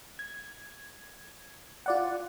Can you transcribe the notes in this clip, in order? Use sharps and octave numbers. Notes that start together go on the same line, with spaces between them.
G#6
F4 D5 F#5